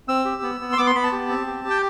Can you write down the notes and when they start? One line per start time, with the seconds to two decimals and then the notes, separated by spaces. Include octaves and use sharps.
0.08 C4 E6
0.25 G4
0.42 B3
0.61 B3
0.72 C6
0.77 B3 D6
0.87 C6
0.95 B3 B5
1.04 A5
1.12 G4
1.29 C4
1.47 G4
1.65 G4
1.70 G5